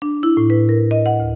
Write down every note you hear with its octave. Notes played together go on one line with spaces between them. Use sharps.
D4
E4
A2
B4
A#4
D#5
F#5
D2